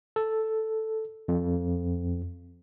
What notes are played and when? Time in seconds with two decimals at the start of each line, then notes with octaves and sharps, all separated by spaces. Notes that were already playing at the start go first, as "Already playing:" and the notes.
0.16 A4
1.28 F2